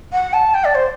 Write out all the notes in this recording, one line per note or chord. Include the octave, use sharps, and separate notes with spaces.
F#5
A5
G5
D5
C5